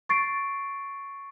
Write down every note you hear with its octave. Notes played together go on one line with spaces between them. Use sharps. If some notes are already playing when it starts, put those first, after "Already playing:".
C#6 A6 C7 D7